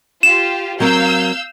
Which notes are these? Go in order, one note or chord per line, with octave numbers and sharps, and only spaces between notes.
F4 G4 E7
F#3 C4 A#4 F5 E6 G6